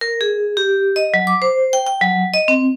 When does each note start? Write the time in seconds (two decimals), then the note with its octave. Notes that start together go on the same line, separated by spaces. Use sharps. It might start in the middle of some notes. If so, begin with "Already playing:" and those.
0.01 A#4
0.21 G#4
0.57 G4
0.96 D#5
1.14 F#3
1.27 D6
1.42 C5
1.73 G5
1.86 G5
2.01 F#3
2.34 D#5
2.48 C4